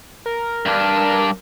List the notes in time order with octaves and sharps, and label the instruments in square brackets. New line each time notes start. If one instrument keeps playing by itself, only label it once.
[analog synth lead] A#4
[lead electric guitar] G2 D4